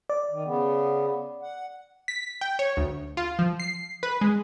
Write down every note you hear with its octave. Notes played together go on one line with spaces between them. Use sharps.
D5
D#3
C#3 B3
F#5
B6
G5
C#5
D2
F4
F3
C7
B4
G#3